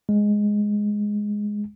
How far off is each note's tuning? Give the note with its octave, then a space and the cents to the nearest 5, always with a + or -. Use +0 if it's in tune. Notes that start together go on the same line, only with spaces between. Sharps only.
G#3 +0